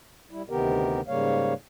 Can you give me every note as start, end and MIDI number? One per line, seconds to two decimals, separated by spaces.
0.31 0.42 55
0.31 0.42 64
0.50 1.01 38
0.50 1.01 48
0.50 1.01 51
0.50 1.01 59
0.50 1.01 67
0.50 1.01 70
1.08 1.54 44
1.08 1.54 49
1.08 1.54 55
1.08 1.54 58
1.08 1.54 73
1.08 1.54 77